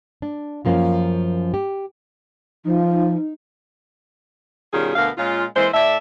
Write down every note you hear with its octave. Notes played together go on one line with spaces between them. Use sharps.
D4
F#2 F3 A#3 B3 C#4 F4
G4
F3 D#4
B2 D#3 G3 C#4 F4 G#4
D2 B2 B3 A#4 F5
A#2 G#3 C#4 F4
E3 G#3 A#3 C5
A2 A4 D5 E5